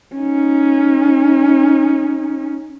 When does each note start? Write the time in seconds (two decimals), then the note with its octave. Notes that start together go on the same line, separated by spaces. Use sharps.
0.15 C#4 D#4